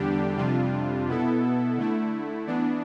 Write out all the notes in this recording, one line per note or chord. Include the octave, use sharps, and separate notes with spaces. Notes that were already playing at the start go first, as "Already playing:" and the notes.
Already playing: E2 D3 G3 D4 G4
F2 C3 G3 D4 F4
B2 B3 E4 A4
D3 A3 E4
E3 B3 D4